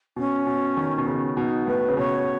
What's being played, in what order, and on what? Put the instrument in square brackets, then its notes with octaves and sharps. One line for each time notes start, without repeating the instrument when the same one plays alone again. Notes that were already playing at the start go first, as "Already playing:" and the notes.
[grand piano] B2 [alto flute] C#4
[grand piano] B2
D#3
B2
C#3
[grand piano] B2 [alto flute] D#4
[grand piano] A2 [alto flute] B4
[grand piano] C#3
[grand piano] B2 [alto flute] C#5